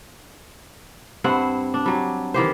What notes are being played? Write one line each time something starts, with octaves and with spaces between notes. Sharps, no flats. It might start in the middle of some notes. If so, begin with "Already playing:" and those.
G2 C4 E4 F#5
D4
F#3 G3
D#3 E3 G4 C5